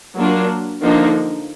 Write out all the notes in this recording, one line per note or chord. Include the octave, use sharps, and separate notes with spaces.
F#3 A#3 D4 F4
D3 F3 A#3 D#4